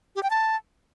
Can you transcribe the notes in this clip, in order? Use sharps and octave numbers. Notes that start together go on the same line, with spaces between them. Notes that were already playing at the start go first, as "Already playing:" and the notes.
G4
G5
A5